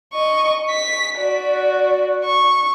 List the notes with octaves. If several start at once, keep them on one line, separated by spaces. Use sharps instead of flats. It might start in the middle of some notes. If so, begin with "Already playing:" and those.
D#5 C#6
B6
F#4 D5
C#6